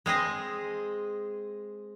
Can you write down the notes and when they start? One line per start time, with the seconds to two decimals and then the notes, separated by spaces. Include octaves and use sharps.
0.06 G#3 C4 G#4 D#5